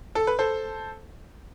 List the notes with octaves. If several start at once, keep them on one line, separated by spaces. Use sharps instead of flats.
A4
B4
A4 C5